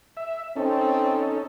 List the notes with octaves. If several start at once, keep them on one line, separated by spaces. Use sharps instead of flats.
E5
C4 C#4 D#4 A4